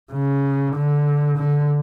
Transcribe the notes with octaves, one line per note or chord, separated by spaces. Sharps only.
C#3
D3
D3